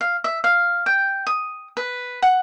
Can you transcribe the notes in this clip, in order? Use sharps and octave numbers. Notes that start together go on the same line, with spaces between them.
F5
E5
F5
G5
D#6
B4
F#5